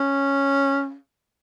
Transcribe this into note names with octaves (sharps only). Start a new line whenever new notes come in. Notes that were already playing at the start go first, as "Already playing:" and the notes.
Already playing: C#4